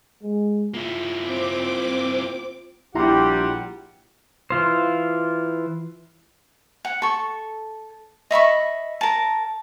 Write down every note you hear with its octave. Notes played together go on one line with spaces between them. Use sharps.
G#3
A#3 E4 F4
C4 D6
A#1 G3 E4 G4 F#5 A#5 C6
E3 F4 C5
F#5
A4 C#6
D#5 E5 B5 C#6
A#4 A5